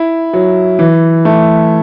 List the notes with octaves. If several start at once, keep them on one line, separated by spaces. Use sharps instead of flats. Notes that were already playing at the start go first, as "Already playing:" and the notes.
Already playing: E4
F#3
E3
A3